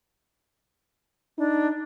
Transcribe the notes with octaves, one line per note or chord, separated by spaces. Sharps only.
D4 D#4